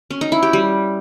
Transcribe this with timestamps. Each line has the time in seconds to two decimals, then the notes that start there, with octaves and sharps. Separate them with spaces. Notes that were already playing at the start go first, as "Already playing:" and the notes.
0.11 C#4
0.21 D#4
0.32 E4
0.43 G4
0.53 G3